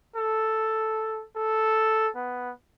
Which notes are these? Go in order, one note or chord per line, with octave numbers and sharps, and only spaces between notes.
A4
A4
B3